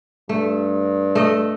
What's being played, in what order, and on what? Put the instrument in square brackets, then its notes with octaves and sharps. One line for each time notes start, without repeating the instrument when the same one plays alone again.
[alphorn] G2 [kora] A3
[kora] A3 D#5